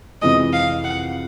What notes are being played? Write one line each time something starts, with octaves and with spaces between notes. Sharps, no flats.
F2 C3 E3 G#3 D#5
F5
F#5